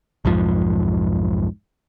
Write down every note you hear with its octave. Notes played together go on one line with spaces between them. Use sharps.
B1 F2 G#2 F3